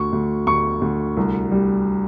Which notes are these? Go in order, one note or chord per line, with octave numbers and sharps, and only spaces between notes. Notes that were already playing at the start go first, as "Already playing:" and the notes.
Already playing: D2 C#6
D2
D2 C#6
D2
C2
G3